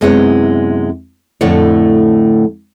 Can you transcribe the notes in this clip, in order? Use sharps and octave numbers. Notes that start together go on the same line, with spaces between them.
F#2 C3 G#3 B3 E4 C#5
F2 A2 D3 A3 E4 C#5